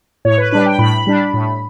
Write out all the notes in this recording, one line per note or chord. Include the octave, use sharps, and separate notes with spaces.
A2 C#5
B4
G3 D4 B4
G5
A2 B5
G3 D4
A2